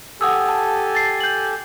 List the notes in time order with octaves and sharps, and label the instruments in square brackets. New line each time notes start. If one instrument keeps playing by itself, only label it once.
[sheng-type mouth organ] G4 A4 G#5 [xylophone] F#5 D#6 E6
[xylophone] A5
A6 C7
G6 F#7